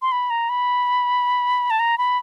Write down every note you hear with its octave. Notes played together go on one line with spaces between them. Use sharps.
C6
B5
A#5
B5
A5
A#5
B5